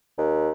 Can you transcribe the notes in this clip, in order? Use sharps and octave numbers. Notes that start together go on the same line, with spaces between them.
D#2